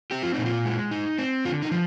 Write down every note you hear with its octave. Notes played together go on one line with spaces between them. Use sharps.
C4 G4
F4
A#2 D#4
F4
G#3
D#4
C4
D3 F4
D#4
F3